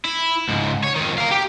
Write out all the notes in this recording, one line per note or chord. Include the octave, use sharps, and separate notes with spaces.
E4
C#2 G#2
C#5
F2 D#3
A#4 F5
G4